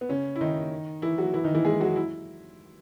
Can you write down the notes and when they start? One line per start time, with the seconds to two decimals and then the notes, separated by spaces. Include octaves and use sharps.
0.01 B3
0.09 C#3 C#4
0.36 E4
0.41 D#3 D#4
1.02 E3 E4
1.18 F#3 F#4
1.34 E3 E4
1.44 D#3 D#4
1.55 E3 E4
1.65 G#3 G#4
1.81 F#3 F#4
1.96 E4